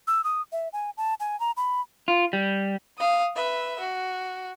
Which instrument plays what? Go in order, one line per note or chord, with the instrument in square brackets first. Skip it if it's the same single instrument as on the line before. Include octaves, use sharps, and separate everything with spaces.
[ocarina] E6
D#6
E5
G#5
A5
G#5
A#5
B5
[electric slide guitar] F4
G3
[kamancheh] F5 D#6
B4 E5
F#4